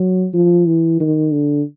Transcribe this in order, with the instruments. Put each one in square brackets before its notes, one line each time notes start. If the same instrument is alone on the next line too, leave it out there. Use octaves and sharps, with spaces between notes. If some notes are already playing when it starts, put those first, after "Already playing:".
Already playing: [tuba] F#3
F3
E3
D#3
D3